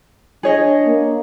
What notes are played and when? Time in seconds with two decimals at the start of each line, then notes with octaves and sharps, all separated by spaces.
0.43 D4 G#4 C#5 D#5
0.87 A#3